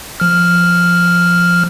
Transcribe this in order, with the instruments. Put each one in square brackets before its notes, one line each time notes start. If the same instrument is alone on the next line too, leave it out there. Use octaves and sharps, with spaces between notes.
[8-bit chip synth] F3 F6